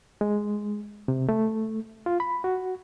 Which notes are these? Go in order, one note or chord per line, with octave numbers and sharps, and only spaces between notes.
G#3
C3
A3
F4
B5
F#4